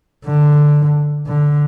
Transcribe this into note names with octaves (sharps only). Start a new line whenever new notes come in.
D3
D3